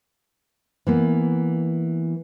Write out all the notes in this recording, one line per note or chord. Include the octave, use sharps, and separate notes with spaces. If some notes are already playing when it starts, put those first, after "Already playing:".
E3 A#3 B3